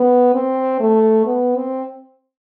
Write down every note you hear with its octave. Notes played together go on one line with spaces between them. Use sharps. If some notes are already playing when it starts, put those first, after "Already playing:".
Already playing: B3
C4
A3
B3
C4